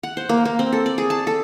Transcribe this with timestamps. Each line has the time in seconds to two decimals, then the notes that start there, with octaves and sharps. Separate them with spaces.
0.03 F#5
0.17 C5
0.29 A#3
0.45 A#3
0.59 C4
0.73 A4
0.86 D5
0.98 G#4
1.10 A5
1.27 A4